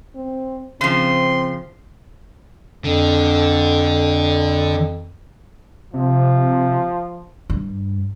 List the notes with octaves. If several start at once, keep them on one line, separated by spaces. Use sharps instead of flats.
C4
C#3 F3 C4 C6
F2 D3
C3 F3
G2